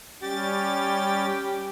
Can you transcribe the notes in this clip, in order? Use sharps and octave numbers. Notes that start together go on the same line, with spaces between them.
G3 C#4 G4 A6